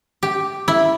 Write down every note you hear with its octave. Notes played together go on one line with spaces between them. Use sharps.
G4
E4